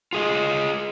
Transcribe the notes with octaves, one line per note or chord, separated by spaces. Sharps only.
F4 G#4 D#5